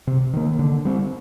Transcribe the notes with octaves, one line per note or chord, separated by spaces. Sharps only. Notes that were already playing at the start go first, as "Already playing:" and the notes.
C3
D#3 A#3
D3
G3 C4